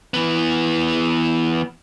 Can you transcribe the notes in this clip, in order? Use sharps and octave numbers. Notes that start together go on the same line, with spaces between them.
E3 B3